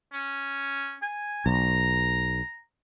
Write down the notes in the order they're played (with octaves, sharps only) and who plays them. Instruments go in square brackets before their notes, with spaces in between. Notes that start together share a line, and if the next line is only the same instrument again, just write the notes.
[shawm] C#4
G#5
[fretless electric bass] B1 [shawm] A#5